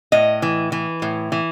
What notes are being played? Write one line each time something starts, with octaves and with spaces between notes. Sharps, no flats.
A2 D#5
E3
E3
A2
E3